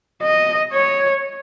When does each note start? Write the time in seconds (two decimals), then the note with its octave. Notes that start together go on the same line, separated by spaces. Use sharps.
0.22 D#5
0.73 C#5